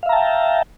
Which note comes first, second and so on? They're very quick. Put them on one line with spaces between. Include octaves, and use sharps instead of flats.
F5 E5 A#5 A5 G5